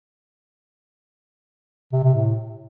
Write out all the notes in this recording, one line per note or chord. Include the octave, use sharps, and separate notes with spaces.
C3
C3
A2